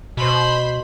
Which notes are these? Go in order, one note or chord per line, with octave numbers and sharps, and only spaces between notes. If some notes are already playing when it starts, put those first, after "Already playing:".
B2 C5 B5